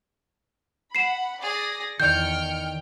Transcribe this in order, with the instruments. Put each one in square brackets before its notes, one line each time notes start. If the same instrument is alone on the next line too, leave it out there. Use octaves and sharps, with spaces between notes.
[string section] F#5 B5 [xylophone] C7 E7
[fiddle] G#4 [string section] D5 A#6
[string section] E2 F6 C#7 [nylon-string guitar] D#3 D5 [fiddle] G5 [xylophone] G6